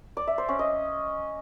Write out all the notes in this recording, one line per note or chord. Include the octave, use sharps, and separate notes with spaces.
D5
E5
C5
C#4
D#5